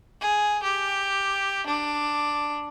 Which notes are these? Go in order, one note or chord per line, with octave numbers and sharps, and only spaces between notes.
G#4
G4
D4